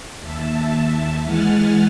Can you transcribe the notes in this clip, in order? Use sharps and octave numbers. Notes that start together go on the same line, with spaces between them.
D#2 E5 A5
E3 G#3 F#5 G#5 F6 A6